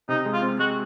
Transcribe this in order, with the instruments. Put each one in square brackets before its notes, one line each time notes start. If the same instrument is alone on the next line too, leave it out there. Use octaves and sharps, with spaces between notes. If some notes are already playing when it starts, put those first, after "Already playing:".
[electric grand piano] C3 [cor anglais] D#4
[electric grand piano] G#3
[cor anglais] F4
[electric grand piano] C4
[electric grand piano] G#3 [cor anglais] F#4